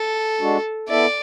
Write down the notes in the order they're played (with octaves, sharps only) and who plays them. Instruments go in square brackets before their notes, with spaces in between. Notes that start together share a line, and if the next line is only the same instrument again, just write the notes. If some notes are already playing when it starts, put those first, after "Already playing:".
Already playing: [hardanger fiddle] A4
[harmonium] G#3 D4 F#4
[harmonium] B3 E4 A4 E5 [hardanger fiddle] D5